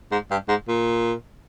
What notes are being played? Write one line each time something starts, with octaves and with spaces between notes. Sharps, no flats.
G#2
G2
G#2
A#2